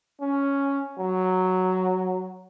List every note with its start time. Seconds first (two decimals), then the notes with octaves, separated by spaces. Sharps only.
0.21 C#4
0.99 F#3